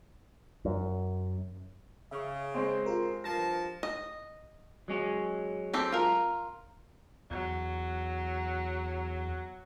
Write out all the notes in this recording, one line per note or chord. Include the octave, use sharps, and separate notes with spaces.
F#2
C#3 E5 C#6
G#3 C4
F4 G4 A#4
G2 F3 A5 A#6
D#5
F#3 G#3 C#4
C4 G4 A4
F4 A#4
E2 F#3